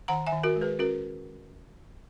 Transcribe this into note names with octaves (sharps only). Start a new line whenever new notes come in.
D#3 F#5 A#5
E5 G#5
D#3
F#4 A#4
G#3
G#4 B4
C#4 F#4 A#4